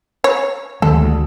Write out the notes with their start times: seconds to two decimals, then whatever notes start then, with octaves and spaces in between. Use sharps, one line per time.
0.24 C#5
0.82 D2 D#3 G#3 A4
1.02 D2